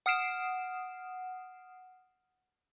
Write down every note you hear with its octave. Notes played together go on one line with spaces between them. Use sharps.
F#5 D#6 F6 C7 D7 E7